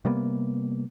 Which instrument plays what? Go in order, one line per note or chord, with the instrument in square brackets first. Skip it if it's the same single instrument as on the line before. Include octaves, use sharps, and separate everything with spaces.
[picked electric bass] C3 G3 A#3 B3